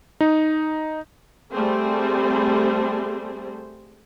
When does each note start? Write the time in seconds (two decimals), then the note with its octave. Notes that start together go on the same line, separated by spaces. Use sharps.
0.21 D#4
1.50 G3 A3 C4 G#4 C5